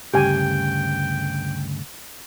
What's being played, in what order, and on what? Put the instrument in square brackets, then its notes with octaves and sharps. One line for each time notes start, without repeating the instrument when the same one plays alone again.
[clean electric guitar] D2 G2 C#3 [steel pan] G4 G#5 [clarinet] G5